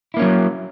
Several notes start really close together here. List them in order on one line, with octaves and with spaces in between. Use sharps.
E4 A#3 C#4 F#3